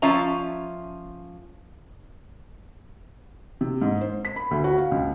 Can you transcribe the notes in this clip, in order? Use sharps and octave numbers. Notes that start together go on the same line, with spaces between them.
F3 C#4 F4 E5 A#5
C3
G#2
C5
B6
B5
D2
F#4
F5
C#2